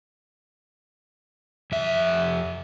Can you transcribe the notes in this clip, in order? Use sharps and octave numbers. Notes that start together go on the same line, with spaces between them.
F2 E5